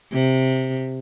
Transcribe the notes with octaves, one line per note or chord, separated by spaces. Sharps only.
C3